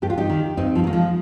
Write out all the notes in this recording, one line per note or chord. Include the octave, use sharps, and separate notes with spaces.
G2 G4
F4
D#4 G4
D#3
G2 C4 D#4
F3
D#3 A#3
F3 G#3